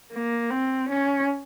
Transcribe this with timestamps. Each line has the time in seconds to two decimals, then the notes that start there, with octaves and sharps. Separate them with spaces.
0.13 A#3
0.50 C4
0.89 C#4